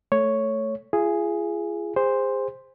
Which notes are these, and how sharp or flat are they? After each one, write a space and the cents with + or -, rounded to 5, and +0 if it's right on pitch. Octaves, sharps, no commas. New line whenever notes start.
A3 +0 C#5 +0
F4 -40 G#4 +0
G#4 -35 C5 +0